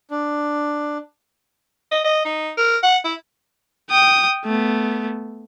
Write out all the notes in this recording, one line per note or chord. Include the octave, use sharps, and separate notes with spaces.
D4
D#5
D#5
D#4
A#4
F#5
E4
G5 D#6
A3 B3